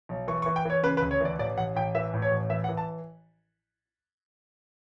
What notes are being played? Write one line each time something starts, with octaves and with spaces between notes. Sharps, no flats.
B1
E3 C#6
C#6
E3
G5
E3 C#5
C#3 B4
B4
D2
C#5
E3 D5
A1 D5
A1 F#5
A1 G5
E3 E5
A2
C#5
A1
E3 E5
F#5
E3
A5